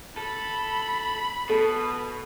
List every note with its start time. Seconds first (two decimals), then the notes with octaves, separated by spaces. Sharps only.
0.17 A4 B5
1.49 B2 A4